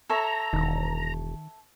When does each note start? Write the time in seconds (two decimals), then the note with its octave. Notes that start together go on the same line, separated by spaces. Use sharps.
0.10 A4 C#5 E5 A#5
0.53 E1 D#3